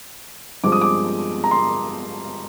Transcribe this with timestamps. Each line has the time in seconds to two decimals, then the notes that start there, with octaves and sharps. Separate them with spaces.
0.63 G2 F3 G#3 C4 D6
0.72 D#6
0.81 D6
1.44 A#5
1.51 C6